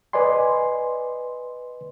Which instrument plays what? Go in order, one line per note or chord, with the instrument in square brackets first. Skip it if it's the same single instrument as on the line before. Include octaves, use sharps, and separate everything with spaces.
[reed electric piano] B4 D5 D#5 G#5 C6